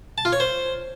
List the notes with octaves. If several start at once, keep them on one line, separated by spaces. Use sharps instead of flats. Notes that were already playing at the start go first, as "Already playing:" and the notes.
A5
F4
C#5
C5